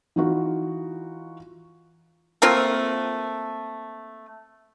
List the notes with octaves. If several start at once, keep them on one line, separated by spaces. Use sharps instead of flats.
E3 D#4 F4 F#4
A3 A#3 C4 F4